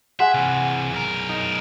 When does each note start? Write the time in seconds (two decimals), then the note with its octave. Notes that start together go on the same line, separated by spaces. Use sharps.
0.20 G#4 E5 F#5 C6
0.34 C3 E3
0.92 B1 A#4
1.29 D#4